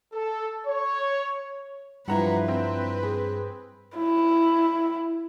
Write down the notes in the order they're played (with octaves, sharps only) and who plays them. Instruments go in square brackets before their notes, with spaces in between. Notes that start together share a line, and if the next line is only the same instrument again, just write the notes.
[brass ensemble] A4
C#5
[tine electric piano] G2 [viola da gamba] F3 B4 [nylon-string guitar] G3 E4 [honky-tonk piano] F#5 A#5
[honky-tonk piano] C4 [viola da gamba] B4
[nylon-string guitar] G#4
[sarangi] E4